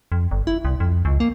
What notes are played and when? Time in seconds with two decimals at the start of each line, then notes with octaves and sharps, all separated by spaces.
0.12 F2
0.31 G1
0.47 E4
0.65 C2
0.80 F2
1.05 C#2
1.20 A#3